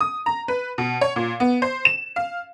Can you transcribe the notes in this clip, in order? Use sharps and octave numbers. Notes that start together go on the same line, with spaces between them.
D#6
A#5
B4
B2
C#5
A#2
B3
C5
E7
F5